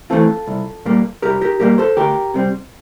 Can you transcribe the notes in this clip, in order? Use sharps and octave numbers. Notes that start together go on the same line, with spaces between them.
E3 A3 C4 F4 A4
C2
A#2 G3 A#3
C2 G4 A#4
G4 A#4
A#2 G3 A#3 G4 A#4
A4 C5
D2 G4 A#4
C3 G3 C4